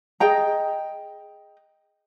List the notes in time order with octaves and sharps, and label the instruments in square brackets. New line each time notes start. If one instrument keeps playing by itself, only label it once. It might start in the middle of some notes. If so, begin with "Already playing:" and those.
[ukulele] G#4 D#5 G5 A#5